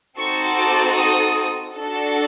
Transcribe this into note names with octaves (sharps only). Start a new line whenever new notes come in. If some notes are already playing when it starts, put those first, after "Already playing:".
C4 D#4 F#4 A4 C#6
D6
D#6
D4 F#4 A4